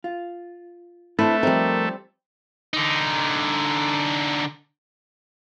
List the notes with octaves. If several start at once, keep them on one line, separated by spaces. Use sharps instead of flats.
F4
A3 C4 D4 E4 A4 B4 C5
F3 G3 C4 D#4 A#4
D3 D#4